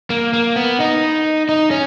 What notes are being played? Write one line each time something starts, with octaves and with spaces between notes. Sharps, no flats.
A#3
A#3
B3
D#4
D#4
C#4